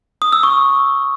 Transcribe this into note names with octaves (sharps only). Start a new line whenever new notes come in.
D#6
E6
C#6